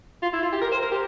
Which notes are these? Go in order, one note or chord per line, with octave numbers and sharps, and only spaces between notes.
F4
E4
F4
G4
A#4
C5
A#4
G4